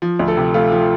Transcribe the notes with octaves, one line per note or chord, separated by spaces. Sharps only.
F3
D2
A4
C3
A3 F4
F3